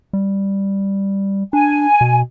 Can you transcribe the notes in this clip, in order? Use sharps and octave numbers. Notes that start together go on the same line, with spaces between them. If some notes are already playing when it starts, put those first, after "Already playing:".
G3
D4 G#5
B2